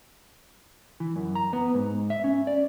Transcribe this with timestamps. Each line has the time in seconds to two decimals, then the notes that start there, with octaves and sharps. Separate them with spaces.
1.00 E3
1.16 F#2
1.35 A#5
1.53 B3
1.75 G#2
2.10 E5
2.24 C#4
2.47 D5